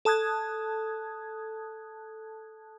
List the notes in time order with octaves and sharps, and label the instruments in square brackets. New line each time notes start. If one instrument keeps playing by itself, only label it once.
[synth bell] A4 A5 D#6 F#6 G#6